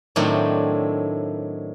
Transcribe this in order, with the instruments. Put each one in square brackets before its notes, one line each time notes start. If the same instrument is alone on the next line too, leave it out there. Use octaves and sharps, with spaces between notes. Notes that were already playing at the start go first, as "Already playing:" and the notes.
[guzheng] A2 D#3 F#3 A3 C4 D4